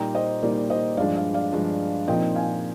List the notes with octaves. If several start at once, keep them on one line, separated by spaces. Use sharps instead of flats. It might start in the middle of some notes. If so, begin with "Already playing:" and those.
Already playing: A#2 G3 A#3 D#4 G5 A#5
C5 D#5
A#2 G3 A#3 D#4 D5
C5 D#5
G2 F3 G#3 D4 D5 F5
D5 F5
D5 F5
G2 F3 G#3 D4
A#2 F3 C4 D#4 D#5 G5
F5 G#5